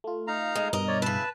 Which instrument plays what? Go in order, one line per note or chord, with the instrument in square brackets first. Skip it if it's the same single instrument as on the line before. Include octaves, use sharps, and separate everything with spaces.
[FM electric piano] A3 F4
[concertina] D#4 F5 A#5
[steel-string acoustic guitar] G#3
[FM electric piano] G2 B2 [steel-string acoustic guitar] A#4 D#5
[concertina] C#5 D5
[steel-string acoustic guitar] C#3 E4 [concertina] B4 A5